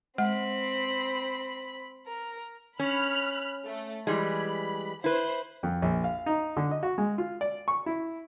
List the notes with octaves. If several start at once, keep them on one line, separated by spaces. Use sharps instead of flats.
G#3 C4 F#5 B5
A#4
C#4 B5 F6 F#6
A3
E3 G3 G#3 B5
E4 B4 C5
F2
A#1
F5
D#4
D3
D#5
F#4
G#3
F4
D5
C#6
E4